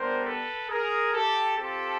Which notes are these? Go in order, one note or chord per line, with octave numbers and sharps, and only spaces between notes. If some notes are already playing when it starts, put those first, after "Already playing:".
Already playing: G3 B3 D4 G4 A#4 C5
A4 B4
G#4 A#4
G4 A4
C4 F4 G4 A4